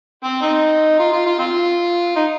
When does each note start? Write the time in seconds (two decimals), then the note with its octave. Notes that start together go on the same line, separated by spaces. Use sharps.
0.24 C4
0.42 C4 D#4
1.00 F4
1.12 F4
1.26 F4
1.39 C4 F4
2.16 D#4